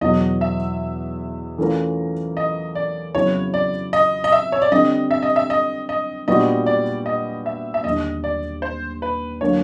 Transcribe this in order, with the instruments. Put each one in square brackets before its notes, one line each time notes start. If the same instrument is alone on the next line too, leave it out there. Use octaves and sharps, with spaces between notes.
[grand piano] E2 B2 F#3 B3 [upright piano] D#5
[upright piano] E5
[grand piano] E3 A3 C#4 F4 A#4
[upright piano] D#5
D5
[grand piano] F2 C#3 F#3 B3 E4 [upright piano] C#5
[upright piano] D5
D#5
D#5
E5
C#5
D5
[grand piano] D3 G3 C4 [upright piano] D#5
[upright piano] E5
D#5
E5
D#5
D#5
[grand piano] A#2 G3 B3 D4 F#4 [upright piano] D#5
[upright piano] D5
D#5
E5
E5
[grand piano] D#2 D3 G3 [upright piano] D#5
[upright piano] D5
C5
B4
[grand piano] D3 F#3 A#3 [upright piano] C#5